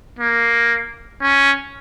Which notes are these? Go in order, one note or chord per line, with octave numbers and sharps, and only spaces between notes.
A#3
C#4